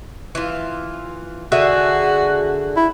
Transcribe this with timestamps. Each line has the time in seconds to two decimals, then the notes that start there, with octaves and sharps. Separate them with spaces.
0.35 E3 F4
1.52 D3 F#4 G#4 E5
2.76 E4